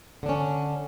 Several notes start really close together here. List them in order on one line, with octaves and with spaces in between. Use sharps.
D3 D4 C#4